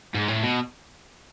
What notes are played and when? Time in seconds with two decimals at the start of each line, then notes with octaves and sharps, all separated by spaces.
0.15 G#2
0.28 A2
0.43 B2